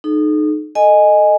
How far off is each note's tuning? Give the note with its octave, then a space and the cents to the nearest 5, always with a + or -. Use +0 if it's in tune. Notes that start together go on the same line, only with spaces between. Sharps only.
D#4 -30 A4 -40
A4 +0 D#5 -10 G#5 +0